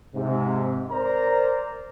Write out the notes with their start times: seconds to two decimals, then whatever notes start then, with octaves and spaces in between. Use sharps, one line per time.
0.16 G#2 C3
0.92 A#4 C5 D5 A#5